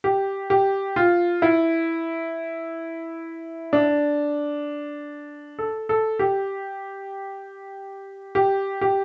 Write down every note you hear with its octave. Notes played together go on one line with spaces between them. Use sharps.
G4
G4
F4
E4
D4
A4
A4
G4
G4
G4